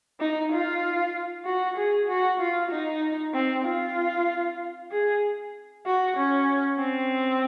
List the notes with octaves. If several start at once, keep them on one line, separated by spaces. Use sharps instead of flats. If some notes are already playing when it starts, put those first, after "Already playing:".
D#4
F4
F#4
G#4
F#4
F4
D#4
C4
F4
G#4
F#4
C#4
C4